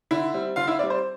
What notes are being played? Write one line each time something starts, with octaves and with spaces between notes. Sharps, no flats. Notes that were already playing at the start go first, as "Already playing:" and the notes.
D3 E4 E5
G3 C4
D3 F4 F5
E4 E5
G3 C4 D5
C5